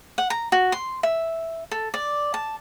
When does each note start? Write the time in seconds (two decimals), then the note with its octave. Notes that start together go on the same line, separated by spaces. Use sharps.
0.18 F#5
0.30 A#5
0.52 F#4
0.72 C6
1.03 E5
1.71 A4
1.94 D5
2.34 A5